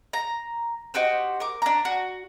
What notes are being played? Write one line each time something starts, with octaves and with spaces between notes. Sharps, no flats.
A#5
D#4 F#4 G4 C5
A#4 D6
D4 A#5
F#4